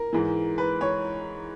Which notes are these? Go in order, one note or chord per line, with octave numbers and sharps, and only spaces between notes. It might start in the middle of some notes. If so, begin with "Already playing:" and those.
Already playing: A#4
G#2 E3
B4
C#5